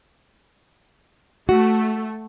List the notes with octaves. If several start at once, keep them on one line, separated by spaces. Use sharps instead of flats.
A3 F#4